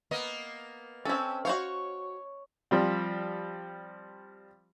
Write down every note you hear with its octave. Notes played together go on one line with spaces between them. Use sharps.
A#3 B3 D#5
C4 C#4 A4
F#4 C5 C#5 F5
F3 G3 C4